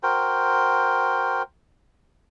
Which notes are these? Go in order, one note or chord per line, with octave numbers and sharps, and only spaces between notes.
F#4 A#4 C5 G5